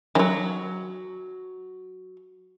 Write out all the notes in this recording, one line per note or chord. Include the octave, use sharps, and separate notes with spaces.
D#3 F#3